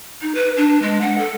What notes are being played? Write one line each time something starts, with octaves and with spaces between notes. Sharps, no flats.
D#4
B4
D4
G#3
F#5
A4